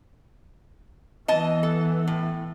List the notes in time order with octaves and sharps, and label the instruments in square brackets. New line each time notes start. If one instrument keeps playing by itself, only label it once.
[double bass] E3 B3 [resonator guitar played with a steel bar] D#5 A5
[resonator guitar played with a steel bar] A4
A2